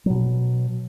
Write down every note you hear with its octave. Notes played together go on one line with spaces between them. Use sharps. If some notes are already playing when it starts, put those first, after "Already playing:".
B2 F#3